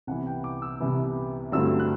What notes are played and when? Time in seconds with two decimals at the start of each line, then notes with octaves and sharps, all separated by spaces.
0.07 C2 C3 E3 B3 F#5
0.27 G5
0.44 D6
0.62 E6
0.80 C2 C3 E3 B3
1.52 G2 D3 F#3 A3 C4 E6
1.80 F#6